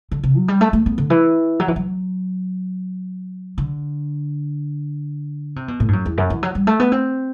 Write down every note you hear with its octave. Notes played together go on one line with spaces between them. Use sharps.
D3
C3
F#3
G3
A3
A3
B3
D3
E3
F#3
E3
F#3
D3
C3
B2
A2
G2
F#2
E2
F#2
E3
F#3
G3
A3
B3
C4